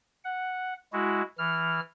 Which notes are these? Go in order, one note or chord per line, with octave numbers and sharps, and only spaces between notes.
F#5
G#3 E4 F#4
E3 F6